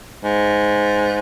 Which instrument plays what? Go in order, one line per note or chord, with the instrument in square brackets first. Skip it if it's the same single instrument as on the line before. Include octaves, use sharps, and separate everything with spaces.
[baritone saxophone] G#2